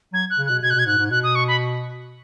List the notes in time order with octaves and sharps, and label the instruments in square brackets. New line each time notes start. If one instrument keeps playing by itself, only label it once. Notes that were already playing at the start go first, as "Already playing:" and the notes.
[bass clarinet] F#3 [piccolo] G#6
[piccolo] F#6
[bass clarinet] C#3
[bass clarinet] B2 [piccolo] F#6
[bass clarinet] B2 [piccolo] G#6
[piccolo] F#6
[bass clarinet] B2 [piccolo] G#6
[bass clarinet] G#2 [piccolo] F#6
[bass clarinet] G#2
[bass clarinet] B2 [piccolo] F#6
[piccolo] D#6
C#6
B5